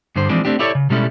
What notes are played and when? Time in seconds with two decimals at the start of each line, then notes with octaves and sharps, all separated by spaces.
0.16 G2 D3 C5
0.29 E3 F3 G#3 C4 D4
0.45 A3 C4 D4 G4
0.59 E4 G4 A4 C#5 D5 E5
0.75 C#3
0.90 B2 G3 G#3 C#4 E4 A4